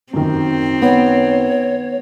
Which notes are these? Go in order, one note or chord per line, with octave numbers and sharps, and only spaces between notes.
F#2 D#3 C4
B3 C#5